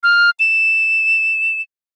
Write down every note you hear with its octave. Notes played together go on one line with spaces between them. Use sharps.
F6
E7